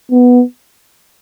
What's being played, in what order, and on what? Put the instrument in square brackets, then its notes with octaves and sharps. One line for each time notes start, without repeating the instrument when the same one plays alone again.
[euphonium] B3